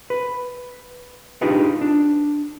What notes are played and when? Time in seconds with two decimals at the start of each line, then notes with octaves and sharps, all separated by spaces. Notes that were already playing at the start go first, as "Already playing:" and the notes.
0.10 B4
1.41 D4 D#4 F4 G4 G#4 B4
1.81 D4